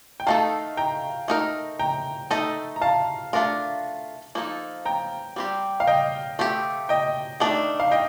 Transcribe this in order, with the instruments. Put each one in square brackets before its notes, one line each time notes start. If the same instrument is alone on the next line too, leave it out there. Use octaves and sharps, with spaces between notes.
[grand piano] G5
[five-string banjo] D#3 A3 D#4 A4 [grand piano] F5 A5
[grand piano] G5 A#5
[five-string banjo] A3 D#4 A#4
[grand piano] G5 A#5
[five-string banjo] A3 D#4 A4 D#5
[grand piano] A#5
F5 A5
[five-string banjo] A3 D4 F4 A#4
F3 A#3 D#4 A4
[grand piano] G5 A#5
[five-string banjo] G3 C4 G4
[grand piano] F5
D#5 G5
[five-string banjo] A3 C4 G4
[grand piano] D#5 G5
[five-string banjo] D#3 A3 D4
[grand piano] F5
D#5 G5